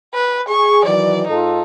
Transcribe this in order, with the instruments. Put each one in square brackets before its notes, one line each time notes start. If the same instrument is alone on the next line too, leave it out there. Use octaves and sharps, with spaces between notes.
[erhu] B4
[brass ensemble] G#4 [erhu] C#6
[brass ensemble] D#3 E3 F#3 [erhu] D5
[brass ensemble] G#2 F4 A4 [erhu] D#4